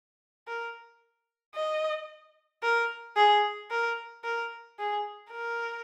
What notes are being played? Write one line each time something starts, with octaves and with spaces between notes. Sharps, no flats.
A#4
D#5
A#4
G#4
A#4
A#4
G#4
A#4